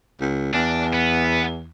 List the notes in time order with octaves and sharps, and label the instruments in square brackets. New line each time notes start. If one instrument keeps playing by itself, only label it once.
[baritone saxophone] C#2
[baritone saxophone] E2 [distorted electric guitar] D4
[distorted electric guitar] B3